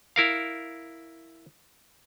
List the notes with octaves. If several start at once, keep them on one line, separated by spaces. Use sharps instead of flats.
E4 A#4 F5